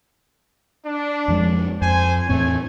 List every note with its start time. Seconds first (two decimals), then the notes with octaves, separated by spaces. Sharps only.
0.85 D4
1.28 F2 F3 G#3
1.82 F2 C5 G#5
2.29 E2 A2 A3 C4 C#5 G#5